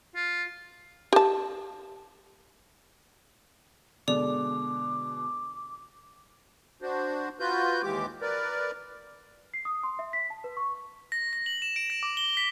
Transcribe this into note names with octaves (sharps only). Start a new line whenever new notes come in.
F4
G4 A5
B2 D3 G#3 D5 D6 F7
D4 F#4 C5
F4 F#4 B4 G6
D#2 E3 G#3 G4 D6
A#4 B4 D5
C7
D#6
C6
E5
B6
A5
B4
C#6
A#6
A#6
F#7
E7
D7
A#6
D6
G7
B6